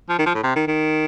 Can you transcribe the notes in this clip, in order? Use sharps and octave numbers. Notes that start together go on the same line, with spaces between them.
F3
D#3
F3
A2
C3
D#3
D#3